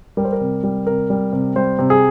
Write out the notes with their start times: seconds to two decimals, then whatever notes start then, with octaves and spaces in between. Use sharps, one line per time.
0.17 G3 A#4
0.25 C5
0.32 A#4
0.41 C3
0.63 G3
0.87 C3 A#4
1.10 G3
1.33 C3
1.56 G3 C5
1.79 C3
1.90 G#4